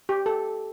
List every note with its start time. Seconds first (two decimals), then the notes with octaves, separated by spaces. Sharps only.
0.09 G4
0.26 A4